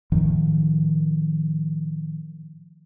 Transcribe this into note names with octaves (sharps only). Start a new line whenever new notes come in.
A2 D#3 F3